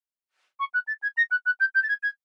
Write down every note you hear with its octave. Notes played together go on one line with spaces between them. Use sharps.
C#6
F#6
A6
G#6
A#6
F#6
F#6
G6
G6
A6
G#6
G#6